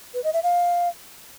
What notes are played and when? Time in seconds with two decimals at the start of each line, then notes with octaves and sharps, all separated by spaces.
0.14 B4
0.24 D#5
0.33 E5
0.43 F5